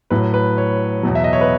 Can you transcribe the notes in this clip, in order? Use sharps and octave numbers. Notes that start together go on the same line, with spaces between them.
A2 F#3 B4
B4
C#5
E2 B2 F#3
E5
D#5
C#5
B4